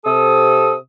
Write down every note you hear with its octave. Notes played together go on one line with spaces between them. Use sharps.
C3 A4 D#6